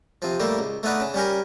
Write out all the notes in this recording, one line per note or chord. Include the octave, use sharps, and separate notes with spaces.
C3 F3
A2 G3 A3 A#3
C#2
A3 B3 D#4 B4 D5
C#3
G3 C#4 G4 A#4